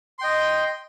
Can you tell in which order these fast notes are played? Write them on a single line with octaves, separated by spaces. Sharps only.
C6 G5 D#5